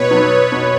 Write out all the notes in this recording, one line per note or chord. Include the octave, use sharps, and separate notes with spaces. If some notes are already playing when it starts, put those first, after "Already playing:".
Already playing: B2 B4 C#5
F#3 B3
B2